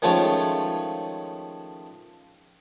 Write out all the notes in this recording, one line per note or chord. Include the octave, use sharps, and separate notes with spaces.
D#3 F3 G#3 A3 C#4 F4